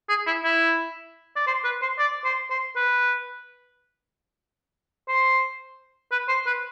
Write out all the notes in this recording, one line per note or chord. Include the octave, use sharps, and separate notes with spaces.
G#4
E4
E4
D5
C5
B4
C5
D5
C5
C5
B4
C5
B4
C5
B4